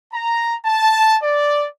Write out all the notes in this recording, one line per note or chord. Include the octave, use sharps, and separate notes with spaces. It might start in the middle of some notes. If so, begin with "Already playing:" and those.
A#5
A5
D5